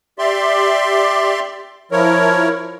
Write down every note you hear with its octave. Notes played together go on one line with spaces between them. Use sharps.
G4 D5 E5 C6
F3 E4 A#4 C#5